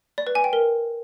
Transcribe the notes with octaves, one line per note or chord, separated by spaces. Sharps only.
D5
B4
G#5
G5
A#4